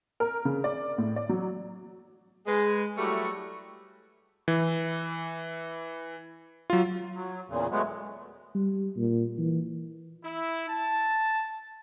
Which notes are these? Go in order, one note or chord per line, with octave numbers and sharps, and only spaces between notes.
A#4
C#3
D5
A2
D5
F#3
G#3 G#4 B4
F#3 G3 A3 E4 F#4 G4
E3
F#3 F4
F#3
E2 A#2 C#3
F#3 G#3 A3 B3
G3
A#2
E3
E4
A5